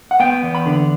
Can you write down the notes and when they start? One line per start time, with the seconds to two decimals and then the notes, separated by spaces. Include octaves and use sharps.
0.11 F#5
0.20 B3 G5
0.43 E2
0.55 B5
0.66 D3